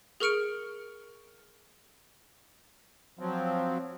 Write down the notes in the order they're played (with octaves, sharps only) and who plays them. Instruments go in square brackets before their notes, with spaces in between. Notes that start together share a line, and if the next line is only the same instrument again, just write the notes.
[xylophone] G#4 A#4 C#6 F6 C#7 D7
[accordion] F3 F#3 C4